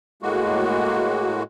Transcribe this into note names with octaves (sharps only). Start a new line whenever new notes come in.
A2 G#3 A#3 F#4